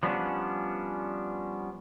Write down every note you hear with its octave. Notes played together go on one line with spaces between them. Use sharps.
F3 G3 B3 C#4 D4